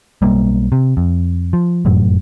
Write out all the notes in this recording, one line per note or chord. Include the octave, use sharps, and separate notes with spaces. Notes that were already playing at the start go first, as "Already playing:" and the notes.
B1 G3 A#3
C3
F2
F3
F1 F#2 A2 F#3